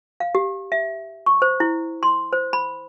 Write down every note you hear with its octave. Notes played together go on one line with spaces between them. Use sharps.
F5
G4
E5
C#6
C5
E4
C6
C5
B5